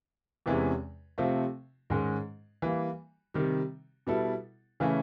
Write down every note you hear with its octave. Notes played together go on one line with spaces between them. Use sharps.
E2 C3 E3 G#3 C#4
C3 F3 A3 C4 F4
G#2 D#3 G#3 C#4
E3 G3 A#3
C3 D#3 G3
B2 G3 B3 E4 A4
C#3 E3 A3 C#4